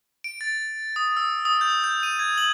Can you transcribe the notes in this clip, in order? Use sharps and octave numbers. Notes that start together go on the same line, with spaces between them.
D7
A6
D#6
E6
D#6
G6
G6
D#7
G#6
F#7